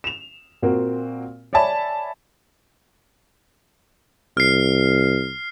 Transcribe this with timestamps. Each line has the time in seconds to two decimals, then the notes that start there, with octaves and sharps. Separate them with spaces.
0.04 E7 F7
0.62 A#2 A#3 C4 F#4
1.53 C#5 D5 E5 G#5 A5 B5
4.37 C2 F6 C7